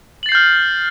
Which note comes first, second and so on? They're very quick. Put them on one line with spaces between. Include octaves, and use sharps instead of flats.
F#7 A6 C7 G6 F6